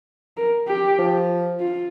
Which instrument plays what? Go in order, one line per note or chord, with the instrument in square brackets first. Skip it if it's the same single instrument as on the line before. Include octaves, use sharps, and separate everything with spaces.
[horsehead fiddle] A#4
G4
[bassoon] F3
[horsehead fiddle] F4